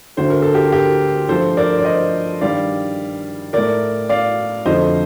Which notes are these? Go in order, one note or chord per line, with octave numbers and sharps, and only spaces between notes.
D2 D3 A3 C5
A#4
A4
G4 A#4
G4 A#4
G2 F3 A3 A4 C5
A#4 D5
D5
C5 D#5
G2 D#3 G3 D5 F5
A2 A3 A#4 D5
D5 F5
F2 D3 F3 A3 C5 D#5